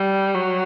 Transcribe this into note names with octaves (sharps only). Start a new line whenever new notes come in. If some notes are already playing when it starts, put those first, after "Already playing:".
Already playing: G3
F#3